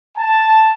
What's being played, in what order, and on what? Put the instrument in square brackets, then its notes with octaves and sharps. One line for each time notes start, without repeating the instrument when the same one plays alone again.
[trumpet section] A5